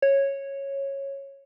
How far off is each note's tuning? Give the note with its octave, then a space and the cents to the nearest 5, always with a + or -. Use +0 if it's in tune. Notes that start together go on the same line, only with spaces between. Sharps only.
C#5 -10